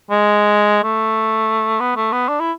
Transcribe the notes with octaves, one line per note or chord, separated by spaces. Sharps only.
G#3
A3
B3
A3
B3
D4
E4